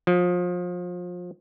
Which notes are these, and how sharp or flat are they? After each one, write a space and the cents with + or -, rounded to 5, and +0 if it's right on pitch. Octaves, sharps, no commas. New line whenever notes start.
F3 +30